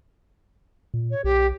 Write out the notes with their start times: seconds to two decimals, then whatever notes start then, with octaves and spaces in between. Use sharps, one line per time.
0.94 A#2
1.11 C#5
1.24 B1 G4